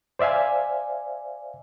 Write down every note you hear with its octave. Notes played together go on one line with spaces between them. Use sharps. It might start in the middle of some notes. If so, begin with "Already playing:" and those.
C5 D5 E5 F5 G#5